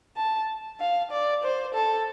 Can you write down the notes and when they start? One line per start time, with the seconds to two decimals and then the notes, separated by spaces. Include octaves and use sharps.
0.17 A5
0.80 F5
1.11 D5
1.43 C5
1.74 A4